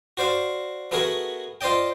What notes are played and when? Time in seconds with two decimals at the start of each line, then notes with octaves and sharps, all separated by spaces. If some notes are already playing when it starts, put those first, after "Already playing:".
0.17 F#4 C5 D5 F5
0.91 A3 B3 F#4 G#4 A#4
1.61 F4 C5 D5 D#5 G5